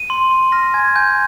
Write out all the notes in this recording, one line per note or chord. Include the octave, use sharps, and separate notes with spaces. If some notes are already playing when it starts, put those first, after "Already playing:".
Already playing: D#7
C6
C6
F6 A#6
G#5 G#6
G#5 G6